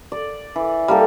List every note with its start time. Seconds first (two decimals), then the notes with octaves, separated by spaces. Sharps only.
0.12 D5
0.56 E3
0.88 G3 A#3 A4